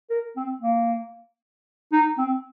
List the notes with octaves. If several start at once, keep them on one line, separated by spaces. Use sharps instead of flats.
A#4
C4
A#3
D#4
C4